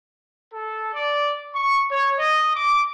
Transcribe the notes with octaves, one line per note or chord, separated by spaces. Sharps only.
A4
D5
C#6
C#5
D#5
D6